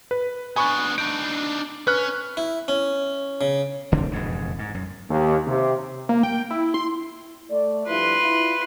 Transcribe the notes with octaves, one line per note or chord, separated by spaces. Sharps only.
B4
B3 D4 G#5 B5 C#6
D4 D#4 D7
C#4 B4 F#6
E4
C#4
C#3
F1 D3 C4 D4
E1 F2 G#2 C#3
G#2
F#2
D#2
C3
A#3
G5
E4
C6
A3 D5
G2 F3 E4 B4 C6
E4 F4